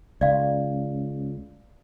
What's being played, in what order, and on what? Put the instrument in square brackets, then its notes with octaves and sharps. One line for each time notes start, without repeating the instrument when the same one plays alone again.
[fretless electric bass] C#2 [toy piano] D5 F5